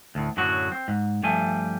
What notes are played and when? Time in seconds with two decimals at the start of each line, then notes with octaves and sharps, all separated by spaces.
0.15 D2 A2
0.37 F#2 A2 D3 F#3 F#4
0.72 C4
0.88 G#2
1.23 G2 F3 G3 A3 G#5